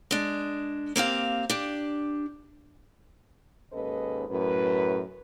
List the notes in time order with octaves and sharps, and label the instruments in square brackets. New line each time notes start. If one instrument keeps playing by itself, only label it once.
[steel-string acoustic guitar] G#3 D4
A#3 C4 G4 F5
D4 G4
[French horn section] D#2 G#2 C#4 A4 B4 D#5
F#2 A2 B4